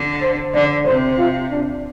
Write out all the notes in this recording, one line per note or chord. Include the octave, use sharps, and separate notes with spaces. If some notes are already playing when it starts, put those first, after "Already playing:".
Already playing: D3
C5
D3 D5
C3 C5
F4
D4